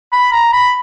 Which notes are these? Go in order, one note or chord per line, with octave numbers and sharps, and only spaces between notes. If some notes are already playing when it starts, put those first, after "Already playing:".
B5
A#5
B5